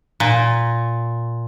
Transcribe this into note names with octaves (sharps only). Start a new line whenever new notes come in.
A#2